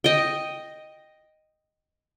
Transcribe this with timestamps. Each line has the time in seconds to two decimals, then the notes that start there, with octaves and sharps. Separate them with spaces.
0.04 D#5 G5